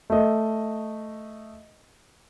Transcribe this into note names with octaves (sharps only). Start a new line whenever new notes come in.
A3 D#5